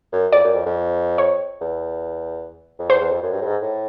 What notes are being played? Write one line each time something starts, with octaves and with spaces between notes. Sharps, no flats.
F#2
F2 D5
F#2
F2
F2
C#5
E2
F2
E2 C5
E2
F2
F#2
G2
A2
G#2
A2